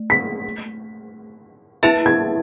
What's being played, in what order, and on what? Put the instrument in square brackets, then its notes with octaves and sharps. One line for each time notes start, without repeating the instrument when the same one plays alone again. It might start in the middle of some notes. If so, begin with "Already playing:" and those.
Already playing: [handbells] A3
[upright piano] B6
[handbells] E4 B4 E5 A5 [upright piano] A6
[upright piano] G#6